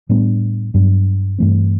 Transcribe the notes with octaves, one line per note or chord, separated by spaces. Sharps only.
A2 G3 B3 D4
G2 F#3 B3 D4
G2 E3 A3 C4